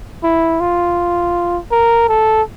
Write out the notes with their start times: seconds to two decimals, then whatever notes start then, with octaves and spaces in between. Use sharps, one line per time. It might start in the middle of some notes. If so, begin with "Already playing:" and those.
0.24 E4
0.60 F4
1.72 A#4
2.09 A4